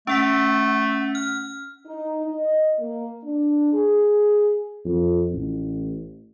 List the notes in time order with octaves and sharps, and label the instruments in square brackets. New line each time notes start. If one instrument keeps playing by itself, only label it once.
[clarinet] A3 [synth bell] C#4 F#5 B6
[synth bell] F6
[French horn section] D#4
D#5
A#3
D4
G#4
[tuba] F2
A1